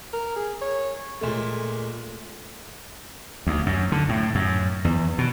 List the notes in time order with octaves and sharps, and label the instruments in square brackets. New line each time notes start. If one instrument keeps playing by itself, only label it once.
[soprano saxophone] A#4
G#4
C#5
[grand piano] A#2 G#3 A3
[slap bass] D2
F#2
D3
A2
F#2
E2
B2